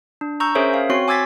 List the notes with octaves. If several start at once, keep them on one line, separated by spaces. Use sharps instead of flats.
D4
A#5 C#6 E6 G6
C#4 G#4 A#4 C5 C#5 E5
F5
C4 F#4 C#5 C6 C7
G#5 D6 E6 G#6 A6 B6